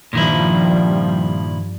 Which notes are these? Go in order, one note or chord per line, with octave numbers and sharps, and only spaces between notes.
G2 A#2 D#3 F3 G3 E4